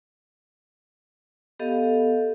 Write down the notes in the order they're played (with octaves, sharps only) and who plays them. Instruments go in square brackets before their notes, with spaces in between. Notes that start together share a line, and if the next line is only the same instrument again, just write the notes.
[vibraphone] B3 G4 A4 D#5 F5